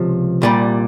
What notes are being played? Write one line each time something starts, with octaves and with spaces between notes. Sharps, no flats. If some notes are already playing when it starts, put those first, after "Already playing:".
Already playing: C#2 C3 F3
C2 A#2 G3